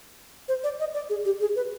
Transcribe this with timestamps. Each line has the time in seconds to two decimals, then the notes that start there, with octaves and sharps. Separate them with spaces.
0.48 C5
0.64 D5
0.80 D#5
0.94 D5
1.10 G#4
1.25 G4
1.41 G#4
1.56 B4